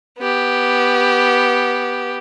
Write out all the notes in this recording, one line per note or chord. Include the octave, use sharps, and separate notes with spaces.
B3 G4